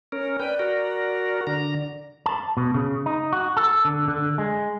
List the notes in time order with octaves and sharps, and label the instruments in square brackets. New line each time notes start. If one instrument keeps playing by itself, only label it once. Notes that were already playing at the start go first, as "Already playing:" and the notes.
[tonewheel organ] C#4 A#4
[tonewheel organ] B4 G5 [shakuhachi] D5
[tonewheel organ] F#4 A#4
D3 A#5
[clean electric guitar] A5
B2
C#3
D#4
F#4
A4
D3
D3
G#3